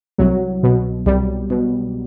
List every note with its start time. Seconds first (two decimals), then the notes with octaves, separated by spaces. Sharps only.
0.18 C2 F#3
0.63 B2
1.06 C2 G3
1.50 B2